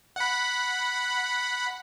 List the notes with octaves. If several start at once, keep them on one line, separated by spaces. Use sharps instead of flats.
F#5 B5